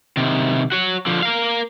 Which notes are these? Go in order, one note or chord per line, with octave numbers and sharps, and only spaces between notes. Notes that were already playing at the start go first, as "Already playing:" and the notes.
C3 D#3
F#4 C#5
D3 F3
A#4 F5